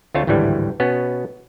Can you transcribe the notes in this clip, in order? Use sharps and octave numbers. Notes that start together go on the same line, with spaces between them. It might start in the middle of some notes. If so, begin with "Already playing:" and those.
D2 A3 C4 F4 C#5 A5
G#1 D2 A2 E3 G3
B2 B3 C#4